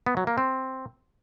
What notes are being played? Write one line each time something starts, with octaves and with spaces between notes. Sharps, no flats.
B3
F#3
A#3
C4